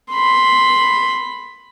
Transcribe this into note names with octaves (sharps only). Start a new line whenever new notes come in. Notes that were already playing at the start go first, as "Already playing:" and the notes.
B5 C6